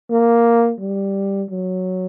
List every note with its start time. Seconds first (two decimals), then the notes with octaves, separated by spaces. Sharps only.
0.10 A#3
0.80 G3
1.50 F#3